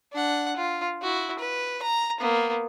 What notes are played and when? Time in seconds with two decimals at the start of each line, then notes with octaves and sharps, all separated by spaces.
0.12 D4 F#5
0.56 F4
1.02 E4 F#4
1.39 B4
1.82 A#5
2.20 A#3 B3